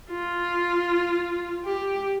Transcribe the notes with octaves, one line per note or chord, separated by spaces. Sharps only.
F4
G4